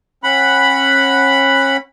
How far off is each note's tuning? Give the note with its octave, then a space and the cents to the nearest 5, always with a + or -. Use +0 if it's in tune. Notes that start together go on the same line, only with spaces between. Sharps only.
C#4 -35 F#5 +0 B5 +0